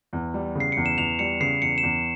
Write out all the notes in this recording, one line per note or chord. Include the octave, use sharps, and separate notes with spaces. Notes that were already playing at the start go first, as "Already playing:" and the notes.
E2
G3
C#3
C7
E2 C#7
E7
E2 F7
G3 C#7
C#3 C7
E2 C#7
E7
E2